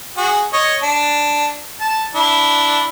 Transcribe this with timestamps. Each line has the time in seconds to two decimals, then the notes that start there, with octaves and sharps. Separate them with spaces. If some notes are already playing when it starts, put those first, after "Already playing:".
0.17 F#4 G#4
0.53 C#5 D#5
0.83 D4
1.81 A5
2.15 D4 E4